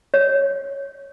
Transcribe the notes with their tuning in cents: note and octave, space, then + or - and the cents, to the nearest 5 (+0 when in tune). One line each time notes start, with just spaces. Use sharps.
C#5 -5